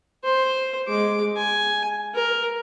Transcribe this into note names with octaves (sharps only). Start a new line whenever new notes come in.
C5
G#3 D6
G#5
A#4